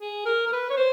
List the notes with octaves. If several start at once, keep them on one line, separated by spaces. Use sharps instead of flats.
G#4
A#4
A#4
B4
C#5
C5